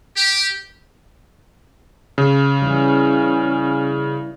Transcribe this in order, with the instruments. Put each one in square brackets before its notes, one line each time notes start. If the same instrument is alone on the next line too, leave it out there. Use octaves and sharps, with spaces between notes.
[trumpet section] G4
[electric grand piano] C#3
[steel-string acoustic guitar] E3 G3 [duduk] C#4